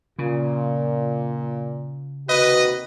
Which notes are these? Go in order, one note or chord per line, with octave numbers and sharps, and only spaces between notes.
A#2 C#3 F4
D#2 C3 F#4 B4 D#5